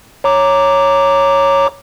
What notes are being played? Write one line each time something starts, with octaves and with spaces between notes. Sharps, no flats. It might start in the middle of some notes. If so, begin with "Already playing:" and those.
C#5 A#5 D6